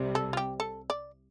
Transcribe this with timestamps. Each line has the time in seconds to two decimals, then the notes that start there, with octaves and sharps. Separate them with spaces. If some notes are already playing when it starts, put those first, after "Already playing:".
Already playing: C2 C3 G3
0.15 A4
0.33 F4
0.37 G4
0.60 A4
0.90 D5